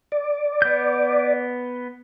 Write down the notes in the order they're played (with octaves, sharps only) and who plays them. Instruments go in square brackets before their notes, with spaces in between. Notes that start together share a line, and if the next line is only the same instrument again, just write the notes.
[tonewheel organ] D5
[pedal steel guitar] B3 G6